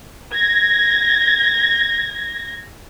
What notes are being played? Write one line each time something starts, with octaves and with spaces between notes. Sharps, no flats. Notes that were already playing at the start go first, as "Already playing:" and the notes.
G#6 A#6